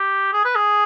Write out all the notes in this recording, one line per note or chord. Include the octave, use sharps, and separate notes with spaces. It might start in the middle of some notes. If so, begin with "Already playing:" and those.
Already playing: G4
G#4
B4
G#4